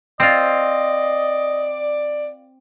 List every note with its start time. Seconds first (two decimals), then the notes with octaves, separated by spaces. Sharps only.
0.20 C4 F4 D5 D#5